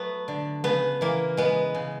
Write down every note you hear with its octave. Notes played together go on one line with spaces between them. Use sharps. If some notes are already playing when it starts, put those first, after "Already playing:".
Already playing: F#3 A3 B3
D3
C#3 B3
E3 A#3
G#3 B3
C#3